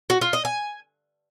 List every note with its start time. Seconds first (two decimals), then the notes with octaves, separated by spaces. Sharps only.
0.10 F#4
0.21 F4
0.33 D#5
0.45 G#5